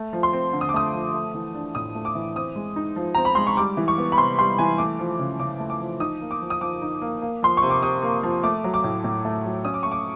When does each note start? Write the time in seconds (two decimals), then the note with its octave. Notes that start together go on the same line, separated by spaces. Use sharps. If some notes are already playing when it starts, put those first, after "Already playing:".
Already playing: A3
0.13 F3
0.23 C6
0.33 C4
0.53 D3
0.61 D#6
0.69 D6
0.74 A3 D#6
0.94 F3
1.14 A3
1.34 E3
1.55 D4
1.75 A2 D#6
1.95 A3
2.05 D6
2.15 E3
2.35 C4 D#6
2.56 G#3
2.76 D#4
2.96 F3
3.15 C4 A#5
3.25 B5
3.35 G#3 C6
3.47 C#6
3.57 G3 D6
3.77 E3
3.88 C#6
3.98 B3
4.12 B5
4.18 C3 C6
4.38 G3 C6
4.58 E3 G#5
4.78 A3 D6
4.99 F3
5.19 C#3
5.40 C#3 D6
5.60 A3
5.70 D6
5.80 F3
6.00 D#4 D#6
6.21 A#3
6.31 D6
6.41 F3
6.50 D#6
6.61 F3 D6
6.82 D#4
7.01 A#3
7.22 A#3
7.43 F3 C6
7.57 C#6
7.62 C3
7.70 D6
7.83 C3 D#6
8.03 A#3
8.23 F3
8.44 A3 D6
8.64 F#3
8.74 D6
8.84 A2
9.04 A2
9.25 A3
9.45 F#3
9.65 C#4 D#6
9.74 D6
9.83 A3 C#6
9.92 D6